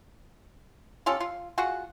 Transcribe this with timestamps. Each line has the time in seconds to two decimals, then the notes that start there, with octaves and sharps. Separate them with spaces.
1.06 C#4 F4 G4 A4
1.20 F4
1.58 F4 F#4 G#4 F#5